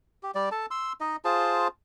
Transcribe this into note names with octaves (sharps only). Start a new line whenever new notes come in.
G4
G3 D5
A4 A5
C6 E6
D#4 D#5
F4 G#4 C5 A5